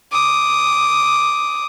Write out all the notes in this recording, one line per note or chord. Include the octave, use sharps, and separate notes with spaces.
D6 D#6